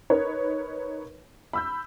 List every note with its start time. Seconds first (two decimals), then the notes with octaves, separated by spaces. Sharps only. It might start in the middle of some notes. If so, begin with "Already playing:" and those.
0.10 D#4 A#4 B4 C#5
1.53 B5 E6 G6